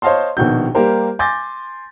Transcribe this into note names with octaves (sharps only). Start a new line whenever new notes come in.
C5 C#5 D#5 F5 A5 C6
A#1 B2 D#3 F#4 G6
G3 A#3 G4 A#4 C5
G#5 C6 D6 G6 A6 A#6